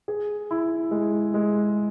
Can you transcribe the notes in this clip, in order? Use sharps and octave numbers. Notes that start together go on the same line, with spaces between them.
G#4
E4
G#3
G#3